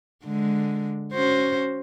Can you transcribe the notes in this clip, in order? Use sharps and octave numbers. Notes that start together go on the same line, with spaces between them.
D3 G#3
C#4 F#4 C5